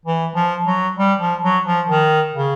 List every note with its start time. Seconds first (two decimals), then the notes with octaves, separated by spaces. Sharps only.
0.05 E3
0.35 F3
0.67 F#3
0.97 G3
1.20 F3
1.43 F#3
1.65 F3
1.89 D#3
2.35 C#3